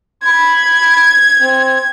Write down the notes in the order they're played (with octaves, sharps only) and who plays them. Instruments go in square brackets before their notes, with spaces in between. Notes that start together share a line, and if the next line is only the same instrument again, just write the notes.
[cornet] B5 [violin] G#6
[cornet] C4